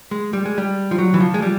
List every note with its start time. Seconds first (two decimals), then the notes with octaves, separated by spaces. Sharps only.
0.11 G#3
0.33 G3
0.45 G#3
0.58 G3
0.91 F3
0.98 F#3
1.14 E3
1.20 F3
1.34 G#3
1.42 G3